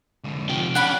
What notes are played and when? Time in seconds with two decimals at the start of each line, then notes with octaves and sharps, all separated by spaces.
0.24 D3 G#3
0.49 C3 F3 G5
0.75 C#4 D4 F#5 B5